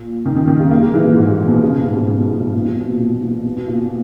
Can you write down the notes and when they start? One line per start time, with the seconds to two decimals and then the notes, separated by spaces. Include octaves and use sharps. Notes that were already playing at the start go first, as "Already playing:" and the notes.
Already playing: A#2
0.26 D#3
0.37 D#3
0.47 D#3
0.60 C#3
0.71 A#3
0.82 G#3
0.94 E3
1.05 A#2
1.16 G#2
1.32 A#2
1.47 B2
1.63 C#3
1.73 B2
1.85 G#2
1.96 G#2
2.08 G#2
2.19 B2
2.31 A#2
2.42 G#2
2.53 A#2
2.64 A#2
2.76 B2
2.88 B2
2.99 A#2
3.21 A#2
3.45 B2
3.57 B2
3.68 A#2